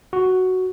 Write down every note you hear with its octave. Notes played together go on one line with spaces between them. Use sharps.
F#4